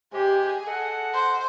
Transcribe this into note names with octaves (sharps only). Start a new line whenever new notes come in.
C3 G#3 G4 G#4
A4 D#5 F#5
C5